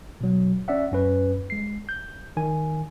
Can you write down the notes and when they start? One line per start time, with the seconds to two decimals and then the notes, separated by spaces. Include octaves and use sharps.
0.21 B2 F#3
0.68 C#4 D5 E5 F#5
0.92 F#2 C#4 B4
1.50 G#3 C7
1.89 G6
2.37 D#3 G#5